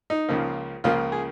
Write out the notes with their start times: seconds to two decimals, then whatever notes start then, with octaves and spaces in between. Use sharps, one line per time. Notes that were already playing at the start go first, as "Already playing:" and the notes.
0.10 D#4
0.29 C#2 C#3 F3 A#3
0.84 C#2 C#3 F3 A#3 F4
1.12 G#4